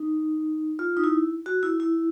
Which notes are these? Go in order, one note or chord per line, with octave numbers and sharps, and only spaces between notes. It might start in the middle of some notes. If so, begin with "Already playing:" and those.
Already playing: D#4
F4
D#4
E4
F#4
E4
E4